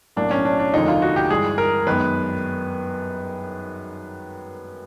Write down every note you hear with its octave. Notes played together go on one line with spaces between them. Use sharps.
B1 A2 F#3 A#3 D4
C#4
D4
D4
F1 D#2 D3 F3 G#3 D#4
F4
F#4
G4
G2 E3 G#3 G#4
A#4
F#2 D#3 G#3 B3 B4